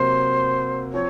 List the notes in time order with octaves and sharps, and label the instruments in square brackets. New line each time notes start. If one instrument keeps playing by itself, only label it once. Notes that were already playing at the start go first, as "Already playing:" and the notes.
Already playing: [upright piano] C3 F#3 A#3 [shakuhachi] C5
[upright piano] F3 C4 [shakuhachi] C#5